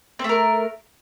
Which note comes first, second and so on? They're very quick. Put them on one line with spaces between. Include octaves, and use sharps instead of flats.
C4 A3 A#4